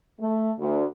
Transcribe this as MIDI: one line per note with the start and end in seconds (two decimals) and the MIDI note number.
0.20 0.51 57
0.59 0.84 38